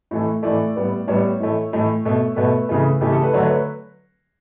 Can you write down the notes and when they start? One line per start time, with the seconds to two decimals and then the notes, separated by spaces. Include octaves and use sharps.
0.11 A2 E3 A3
0.43 A2 E3 A3 D5
0.76 A2 G3 B3
1.07 A2 G3 B3 C#5
1.40 A2 E3 A3
1.73 A2 E3 A3
2.05 B2 A3
2.36 B2 A3 B4
2.69 C#3 E3 A3
3.01 C#3 E3 A3 G4
3.12 A4
3.23 B4
3.33 D3 F#3 A3 C#5
3.45 B4